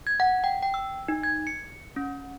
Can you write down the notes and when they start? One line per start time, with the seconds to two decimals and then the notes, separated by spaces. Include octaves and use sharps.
0.07 G#6
0.20 F#5
0.44 G5
0.62 G5
0.74 E6
1.08 D#4
1.23 G#6
1.47 C#7
1.96 C#4